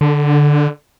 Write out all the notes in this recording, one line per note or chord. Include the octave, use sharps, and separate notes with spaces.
D3